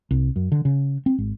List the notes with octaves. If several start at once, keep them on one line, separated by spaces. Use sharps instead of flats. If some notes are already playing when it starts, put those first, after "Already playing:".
C2
F#2
D3
C#3
C4
G#1